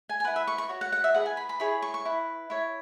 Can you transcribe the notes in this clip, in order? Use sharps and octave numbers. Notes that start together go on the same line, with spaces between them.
G#5
G#5
E4 B4 F#5
E5
C#6
C#6
F#4 C#5
F#5
F#5
E5
E4 G#4 B4 F#5
G#5
B5
B5
E4 G#4 C#5 B5
C#6
C#6
E4 B4
E4 C#5